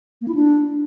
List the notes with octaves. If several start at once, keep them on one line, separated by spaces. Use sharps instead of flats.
A#3
E4
D4